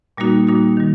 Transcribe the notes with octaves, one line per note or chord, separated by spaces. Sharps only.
A#2 G3 A#3 D#4 F#4
A#2 G3 A#3 D#4 F#4
D#3 G3